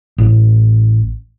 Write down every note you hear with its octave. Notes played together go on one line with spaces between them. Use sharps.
A1